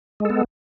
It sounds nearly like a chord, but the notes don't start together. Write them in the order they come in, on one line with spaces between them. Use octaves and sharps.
G#3 A4 B3